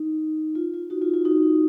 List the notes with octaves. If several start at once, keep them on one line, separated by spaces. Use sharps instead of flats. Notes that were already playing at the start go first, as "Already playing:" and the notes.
Already playing: D#4
F4
F4
D#4 F#4
F4
F4
D#4 F#4